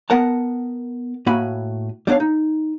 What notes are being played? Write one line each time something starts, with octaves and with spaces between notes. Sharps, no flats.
B3 A#4 F#5 A5
A2 A#3 F#4 G#5 B5
G3 B3 D4 C#5 F5
D#4